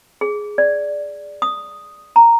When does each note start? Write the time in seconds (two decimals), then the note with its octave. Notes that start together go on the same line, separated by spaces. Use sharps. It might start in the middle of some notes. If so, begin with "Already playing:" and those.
0.21 G#4
0.58 D5
1.42 D#6
2.16 A#5